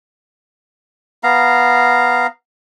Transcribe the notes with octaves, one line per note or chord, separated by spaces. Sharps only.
B3 F5 A#5